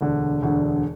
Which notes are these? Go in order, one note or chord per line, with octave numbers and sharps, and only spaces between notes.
E1 D2 D3
E1 D2 D3